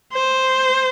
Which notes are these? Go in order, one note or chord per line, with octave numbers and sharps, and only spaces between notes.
C5